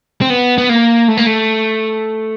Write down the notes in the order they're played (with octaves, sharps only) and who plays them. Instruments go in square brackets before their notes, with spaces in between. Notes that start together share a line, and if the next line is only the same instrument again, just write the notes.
[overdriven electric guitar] C4
B3
B3
A#3
A3
A#3
A3